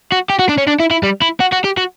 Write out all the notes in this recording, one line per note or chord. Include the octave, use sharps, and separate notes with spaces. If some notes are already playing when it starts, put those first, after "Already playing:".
F#4
G4
F#4
D4
C#4
D4
E4
E4
G3
E4
F#4
F#4
G4
F#4